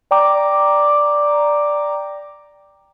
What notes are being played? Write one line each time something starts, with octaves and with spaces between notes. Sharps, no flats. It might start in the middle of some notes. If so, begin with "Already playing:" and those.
D5 G5 A#5 D6